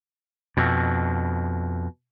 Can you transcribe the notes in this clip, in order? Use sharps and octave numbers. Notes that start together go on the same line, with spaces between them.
F2 B2